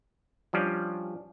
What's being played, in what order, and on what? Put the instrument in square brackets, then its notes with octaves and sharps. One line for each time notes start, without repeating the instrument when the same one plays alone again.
[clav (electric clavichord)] F3 G3 C#4 D4